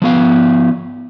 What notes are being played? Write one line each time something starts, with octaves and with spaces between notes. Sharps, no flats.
F3 B3 F5